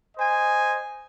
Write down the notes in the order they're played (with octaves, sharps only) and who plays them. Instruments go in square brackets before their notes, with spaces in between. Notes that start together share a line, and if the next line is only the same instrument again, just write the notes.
[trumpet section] C5 D#5 G#5